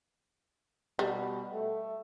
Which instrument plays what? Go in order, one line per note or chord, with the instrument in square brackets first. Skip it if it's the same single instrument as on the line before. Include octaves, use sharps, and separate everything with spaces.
[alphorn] B2 [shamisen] G3
[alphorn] A3